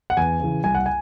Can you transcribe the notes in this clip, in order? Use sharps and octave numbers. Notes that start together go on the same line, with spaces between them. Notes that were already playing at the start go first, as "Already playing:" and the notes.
F#5
E2 G#5
C#3 E3
C2 G#5
F#5
G#5